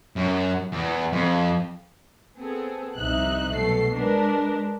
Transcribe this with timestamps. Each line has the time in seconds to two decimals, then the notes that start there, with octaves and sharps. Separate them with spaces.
0.16 F#2
0.72 E2
1.12 F2
2.38 B3 C4 G#4 A4
2.97 C2 F2 C3 D#4 E5 F#6
3.51 B2 F#3 A3 A4 C7
3.94 G#3 D4 A#4 B4